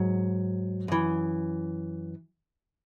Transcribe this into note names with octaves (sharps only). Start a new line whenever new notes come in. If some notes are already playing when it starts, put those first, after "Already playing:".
Already playing: G#2 F#3
F#2 E3